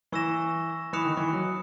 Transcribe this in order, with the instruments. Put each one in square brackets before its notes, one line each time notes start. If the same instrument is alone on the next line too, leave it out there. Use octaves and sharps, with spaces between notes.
[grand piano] E3 [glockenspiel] C#6 E6 A#6 E7
[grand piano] E3 [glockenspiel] B5 D#6 F#6 C#7 E7
[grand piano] D#3
E3
F#3